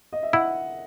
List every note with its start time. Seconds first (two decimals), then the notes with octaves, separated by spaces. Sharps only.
0.13 D#5
0.23 E5
0.33 E4 F#5